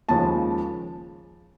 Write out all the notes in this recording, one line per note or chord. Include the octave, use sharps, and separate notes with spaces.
D#2 C#3 F3 G#3 A5